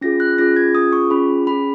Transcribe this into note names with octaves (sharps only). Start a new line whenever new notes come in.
C#4 F4 G#4 A#6
F#6
C#4 F4 G#4 A#6
G#6
C#4 F4 G#4 D#6
C#6
C#4 F4 G#4 B5
C#4 G#4 B5